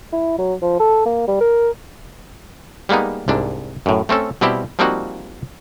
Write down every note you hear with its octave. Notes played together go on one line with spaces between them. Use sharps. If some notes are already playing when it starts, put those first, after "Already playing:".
E4
F#3
F3
A4
A#3
G3
A#4
G3 G#3 A#3 B3 D#4
C2 G#2 D4
F#2 A2
A3 C4 C#4 A4
B2 G3 C4 E4 G4
F3 G3 A#3 C4 D#4 F#4